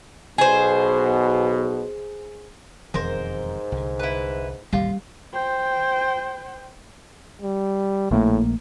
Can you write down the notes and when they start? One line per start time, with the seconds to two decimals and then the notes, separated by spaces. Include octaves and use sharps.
0.38 B1 B2 G#4 C5
2.94 E1 F2 G#2 D#3 A#4 C5
3.72 C2 D3
3.99 E4 B4
4.73 A1 D#2 C3 G3 F4
5.33 C5 G5
7.42 G3
8.11 A#1 A2 A3 A#3